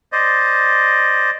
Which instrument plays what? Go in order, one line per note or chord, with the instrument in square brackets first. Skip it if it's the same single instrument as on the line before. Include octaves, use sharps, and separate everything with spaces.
[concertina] C5 D5 D#5